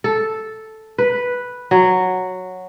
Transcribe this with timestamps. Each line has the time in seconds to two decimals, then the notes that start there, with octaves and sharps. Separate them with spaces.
0.04 A4
0.98 B4
1.71 F#3